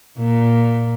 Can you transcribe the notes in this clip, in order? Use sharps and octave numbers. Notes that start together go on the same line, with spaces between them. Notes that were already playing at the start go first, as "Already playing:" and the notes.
A#2